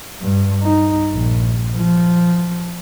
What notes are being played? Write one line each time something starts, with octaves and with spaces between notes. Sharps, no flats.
G2
D#4
A#1
F3